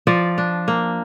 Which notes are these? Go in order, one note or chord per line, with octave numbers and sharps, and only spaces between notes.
F3 D5
D4
A#3